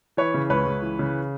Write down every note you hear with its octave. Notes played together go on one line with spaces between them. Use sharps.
E3 B4 C#5
C#3
C#2 B4 C#5
C#2
E3
C#3